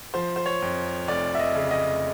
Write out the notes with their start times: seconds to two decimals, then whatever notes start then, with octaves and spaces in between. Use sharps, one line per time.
0.14 F3 C5
0.36 C5
0.46 C#5
0.62 F2
1.08 F1 D5
1.35 E5
1.39 D#5
1.55 C#3
1.71 D#5